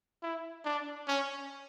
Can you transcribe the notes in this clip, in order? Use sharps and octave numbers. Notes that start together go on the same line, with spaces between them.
E4
D4
C#4